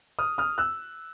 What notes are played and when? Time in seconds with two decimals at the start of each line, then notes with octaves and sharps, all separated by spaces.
0.19 D#6 F6
0.38 D#6 F6
0.58 E6 F#6